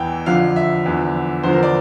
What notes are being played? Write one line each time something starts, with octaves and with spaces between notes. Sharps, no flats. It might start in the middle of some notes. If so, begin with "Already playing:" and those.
Already playing: E2 E3 G5
F2 D3 F3 F5
E5
E2 D3 F3
E2 D3 F3 C5
A#4
D5